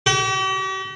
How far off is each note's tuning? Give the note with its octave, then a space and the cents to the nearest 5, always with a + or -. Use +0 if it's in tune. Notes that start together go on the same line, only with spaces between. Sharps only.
G4 -45